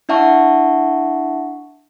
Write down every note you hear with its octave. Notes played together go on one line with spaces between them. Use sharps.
D4 E4 E5 F#5 A5 C#6